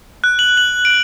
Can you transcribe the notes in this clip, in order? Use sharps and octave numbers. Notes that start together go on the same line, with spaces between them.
F#6
F#7
F#7
D7